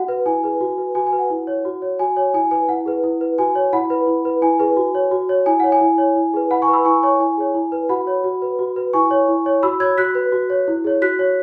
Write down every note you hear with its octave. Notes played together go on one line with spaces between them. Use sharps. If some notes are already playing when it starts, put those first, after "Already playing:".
Already playing: F#4 F#5
B4
E4 G#5
G#4 B4
F#4
B4
F#4 G#5
G#5
B4
F#5
E4
C#5
F#4
C#5
F#4 G#5
C#5 G#5
E4 G#5
B4 G#5
E4 F#5
G#4 B4
E4
B4
F#4 G#5
C#5
E4 F#5 B5
B4
E4
B4
E4 G#5
G#4 B4
F#4
C#5
F#4
C#5
E4 G#5
C#5 F#5
G#5
E4
C#5
E4
G#4 B4
E4 F#5 B5
G#5 C#6
B4
B5 E6
E4 G#5 C#6
C#5 G#5 C#6
E4 G#5
G#4 C#5
E4
B4
F#4 F#5 B5
C#5
F#4
B4
F#4
B4
E4 G#5 C#6
C#5
E4
C#5
F#4 B5 E6
C#5 E6 G#6
F#4 F#6 B6
B4
F#4
C#5
E4
G#4 C#5
F#4 F#6 B6
C#5